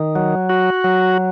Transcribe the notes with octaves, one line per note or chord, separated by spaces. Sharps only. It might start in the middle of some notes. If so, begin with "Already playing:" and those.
Already playing: D#3
F#3
F#4
F#3